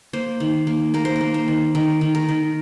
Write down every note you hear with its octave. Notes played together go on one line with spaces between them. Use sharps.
A#3 C5
D#3
A#3
A#3 A#4
C5
A#4
A#3
C5
D#3
D#3 A#4
D#3
A#4
D#3